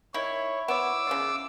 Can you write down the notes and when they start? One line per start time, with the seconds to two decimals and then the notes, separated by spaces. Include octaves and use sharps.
0.14 D#3 E4 C#5
0.68 B3 C#5 D6 E6
1.07 C#3 A#3 F4